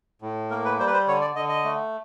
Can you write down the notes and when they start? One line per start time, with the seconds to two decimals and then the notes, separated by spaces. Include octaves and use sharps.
0.22 A2
0.50 A#3 A#4
0.65 B4
0.79 G3 C5
0.87 B4
0.93 C5
1.08 D3 C#5
1.21 D5
1.35 D3 D#5
1.49 D#5
1.64 A3